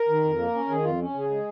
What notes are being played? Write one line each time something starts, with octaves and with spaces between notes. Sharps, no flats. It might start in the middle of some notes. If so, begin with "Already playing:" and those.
Already playing: A#4
D#3
F2
A#3
C#4
D#3 G#4
F2 F4
C#4
C#3 G#4
G#3